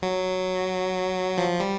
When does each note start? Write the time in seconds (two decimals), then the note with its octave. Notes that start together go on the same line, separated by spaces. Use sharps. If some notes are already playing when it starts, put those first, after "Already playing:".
0.02 F#3
1.38 F3
1.60 G3